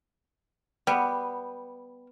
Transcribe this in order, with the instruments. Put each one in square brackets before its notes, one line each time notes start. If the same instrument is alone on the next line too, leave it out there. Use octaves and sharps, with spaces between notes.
[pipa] G3 [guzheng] B3